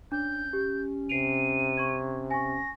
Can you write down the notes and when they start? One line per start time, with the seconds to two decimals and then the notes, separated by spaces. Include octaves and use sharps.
0.12 C#4 D4 G6
0.53 G4
1.09 C3 C7 D7 D#7 F7
1.77 C#6 G#6
2.31 G#5 C#6 A#6